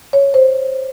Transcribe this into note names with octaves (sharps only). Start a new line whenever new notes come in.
C#5
C5